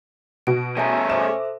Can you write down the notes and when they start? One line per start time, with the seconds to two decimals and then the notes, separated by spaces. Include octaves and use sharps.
0.47 B2 F#4 D7
0.77 A3 C#4 G#4 A5 A#5
1.10 A4 C5 E5 D6 E7